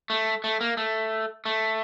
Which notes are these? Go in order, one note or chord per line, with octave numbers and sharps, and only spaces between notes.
A3
A3
A#3
A3
A3